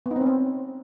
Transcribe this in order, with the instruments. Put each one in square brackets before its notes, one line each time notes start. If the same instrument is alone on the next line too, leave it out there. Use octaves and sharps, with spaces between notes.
[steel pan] B3
D#4
C4
C#4
C4